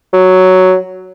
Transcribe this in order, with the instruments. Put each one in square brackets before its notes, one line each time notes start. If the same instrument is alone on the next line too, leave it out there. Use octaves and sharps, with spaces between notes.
[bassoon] F#3